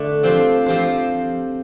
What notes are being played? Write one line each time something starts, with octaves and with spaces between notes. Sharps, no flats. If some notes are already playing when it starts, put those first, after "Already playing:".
Already playing: D3 A3 D4
F3 C4 G4 C5
F3 C4 G4 C5